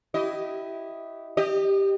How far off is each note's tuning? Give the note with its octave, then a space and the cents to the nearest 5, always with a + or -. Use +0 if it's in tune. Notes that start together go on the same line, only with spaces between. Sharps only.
E4 +0 G4 -25 D#5 +0
G4 +0 D#5 -30